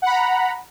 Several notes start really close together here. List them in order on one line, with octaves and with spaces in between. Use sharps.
F#5 B5 A#5